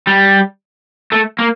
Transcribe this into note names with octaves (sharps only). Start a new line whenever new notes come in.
G3
A3
A#3